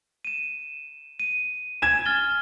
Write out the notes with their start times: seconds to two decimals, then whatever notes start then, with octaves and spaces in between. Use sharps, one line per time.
0.25 D#7 E7
1.20 D#7
1.82 G#5 G#6 E7
2.06 F6 A6 G7